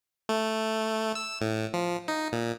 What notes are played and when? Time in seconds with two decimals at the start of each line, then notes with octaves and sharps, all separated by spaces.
0.29 A3
1.15 E6
1.41 A2
1.74 F3
2.08 D#4
2.32 A#2